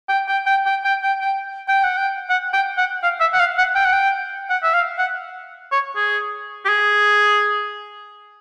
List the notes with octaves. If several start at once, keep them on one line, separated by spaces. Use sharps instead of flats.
G5
G5
G5
G5
G5
G5
G5
G5
F#5
G5
F#5
G5
F#5
F5
E5
F#5
F5
F#5
G5
F#5
G5
F#5
E5
F5
F#5
C#5
G#4
G4
G#4